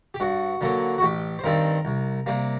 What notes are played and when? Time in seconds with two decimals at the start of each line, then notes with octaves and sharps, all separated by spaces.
0.14 G4
0.20 G2 F#4
0.61 D3 F#3 A#3
0.98 F#4
1.02 A1 G4
1.39 C5
1.44 G2 D#3 G3 C4 A#4
1.85 C2
2.26 C3 G3 A#3